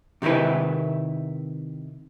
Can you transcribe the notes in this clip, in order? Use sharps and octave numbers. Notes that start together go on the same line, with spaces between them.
C3 D#3 D#4 E4 B4